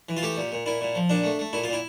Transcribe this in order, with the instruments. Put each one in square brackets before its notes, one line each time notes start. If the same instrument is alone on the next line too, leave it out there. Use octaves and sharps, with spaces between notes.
[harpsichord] E3
F4
A3 G4
A#2
A#2
A#2 E4
A#2
F3
A#2 D4
A3
A3
A#2 E4
F4
A#2
E4